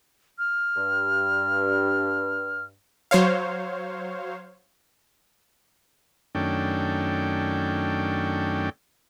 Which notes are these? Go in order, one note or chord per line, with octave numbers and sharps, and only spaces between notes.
F6
G2
F#3 C5 C#5 F5
F#2 D#3 A3 C#4 D4 G5